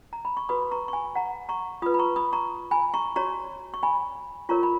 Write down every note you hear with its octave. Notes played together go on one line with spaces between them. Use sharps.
A#5
B5
C#6
F#4 B4 B5 D#6
A#5 C#6
C#6
G#5 B5
F#5 A#5
A#5 C#6
F4 B4 B5 D#6
B5
A#5 C#6
B5 D#6
A#5 C#6
G#5 B5
A#5 C#6
F#4 C#5 A#5 C#6
C#6
G#5 B5
F4 A#4 C#5 A#5 C#6
B5